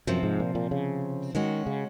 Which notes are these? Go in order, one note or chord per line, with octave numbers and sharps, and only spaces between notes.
F#2 C3 F3 C4
G#2
A#2
A#2
C#3
D#3 G#3 C#4 F#4
C#3